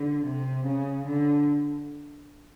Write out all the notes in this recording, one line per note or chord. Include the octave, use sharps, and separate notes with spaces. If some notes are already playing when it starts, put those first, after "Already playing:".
Already playing: D3
C3
C#3
D3